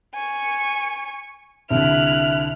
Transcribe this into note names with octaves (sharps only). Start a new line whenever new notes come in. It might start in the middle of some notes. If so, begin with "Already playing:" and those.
G#5 C#6
C2 D3 E5 F6 F#6